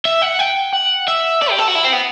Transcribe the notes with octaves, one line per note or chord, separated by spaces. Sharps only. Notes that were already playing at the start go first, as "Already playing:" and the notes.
E5
F#5
G5
F#5
E5
D5
G4
A4
F#4
E4
C4
B3